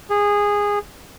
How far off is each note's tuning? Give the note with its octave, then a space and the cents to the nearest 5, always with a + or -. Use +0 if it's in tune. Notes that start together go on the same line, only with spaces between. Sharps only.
G#4 -15